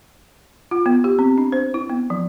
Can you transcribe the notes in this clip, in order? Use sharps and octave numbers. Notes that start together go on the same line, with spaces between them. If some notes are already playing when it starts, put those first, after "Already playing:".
F4
B3
G4
C4
D4
C5
E4
B3
F3